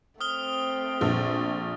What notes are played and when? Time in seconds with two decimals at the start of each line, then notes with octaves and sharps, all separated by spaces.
0.21 A3 C4 D#6 F6 G7
1.01 A#1